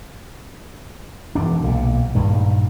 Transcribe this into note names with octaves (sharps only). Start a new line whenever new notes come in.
E1 E2 D4
B1 A#2
A#1 G2 D#3